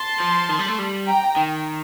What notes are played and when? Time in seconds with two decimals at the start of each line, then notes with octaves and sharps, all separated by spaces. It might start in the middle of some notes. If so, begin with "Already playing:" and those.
Already playing: A5 C6
0.20 F3
0.49 D#3
0.59 G3
0.69 A3
0.79 G3
1.07 G5 A#5
1.36 D#3